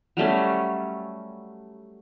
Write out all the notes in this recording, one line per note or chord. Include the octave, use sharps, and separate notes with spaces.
F#3 G3 A3 C#4